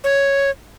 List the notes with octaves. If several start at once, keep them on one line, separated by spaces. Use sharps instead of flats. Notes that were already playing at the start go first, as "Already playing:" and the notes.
C#5